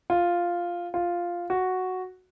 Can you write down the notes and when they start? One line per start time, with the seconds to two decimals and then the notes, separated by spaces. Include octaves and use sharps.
0.10 F4
0.94 F4
1.50 F#4